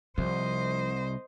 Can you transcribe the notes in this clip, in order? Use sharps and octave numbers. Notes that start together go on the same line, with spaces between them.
C2 F3 C5 D#5